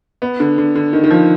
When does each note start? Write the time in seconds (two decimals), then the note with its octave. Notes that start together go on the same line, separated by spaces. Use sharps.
0.22 B3
0.40 D3
0.58 D3
0.75 D3
0.93 D#3
1.04 D#3
1.11 F3